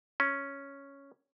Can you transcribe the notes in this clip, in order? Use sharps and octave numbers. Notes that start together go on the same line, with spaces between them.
C#4